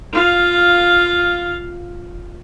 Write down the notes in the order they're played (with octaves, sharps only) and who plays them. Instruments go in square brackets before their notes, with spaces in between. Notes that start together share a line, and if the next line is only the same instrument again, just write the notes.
[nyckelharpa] F4 F5